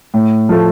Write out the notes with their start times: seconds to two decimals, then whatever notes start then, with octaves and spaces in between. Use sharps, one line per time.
0.14 A2
0.49 F3 A3